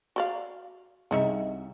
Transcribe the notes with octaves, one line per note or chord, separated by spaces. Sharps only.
F#4 D5 F5
C2 C#3 D#4 E5